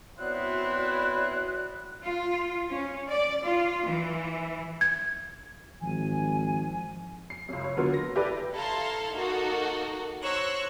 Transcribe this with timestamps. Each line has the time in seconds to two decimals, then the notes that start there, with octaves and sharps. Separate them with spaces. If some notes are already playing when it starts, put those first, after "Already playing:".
0.19 B3 C4 E4 F#4 C#5 D5 F#6
2.02 F4
2.69 C#4
3.08 D5
3.44 F4
3.84 E3
4.81 G#6
5.82 G#1 F3 G#5
7.30 C7
7.49 C#2 F#2
7.64 C#5
7.77 D3 F#3 A#3 B3 F4
7.94 A#6
8.15 E4 G4 A4 B4 D5
8.54 E4 A4 F5 A5 A#5 C6
9.15 A#3 D#4 F#4 A4 A#4
10.23 C5 C#5 A#5 C#6 E6 F#6